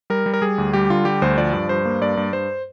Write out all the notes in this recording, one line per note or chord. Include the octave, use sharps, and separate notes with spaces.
G3 A#4
G3
A#4
G3 G#4
D2
G3 G4
D3 F4
G3 G4
D2 C5
F3 D5
G2
G2 C5
A#3
G2 D5
G2
G2 C5